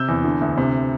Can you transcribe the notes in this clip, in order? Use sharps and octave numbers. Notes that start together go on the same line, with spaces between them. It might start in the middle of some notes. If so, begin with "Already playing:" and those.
Already playing: C3 E6 G6
E2
D3
D2
C3